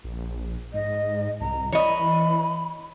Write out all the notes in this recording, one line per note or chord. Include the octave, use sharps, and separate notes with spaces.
A#1
G#2 D#5
C2 A#5
E3 C#5 D#5 B5